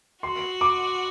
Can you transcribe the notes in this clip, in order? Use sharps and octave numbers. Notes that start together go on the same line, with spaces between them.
F#4 C6
D6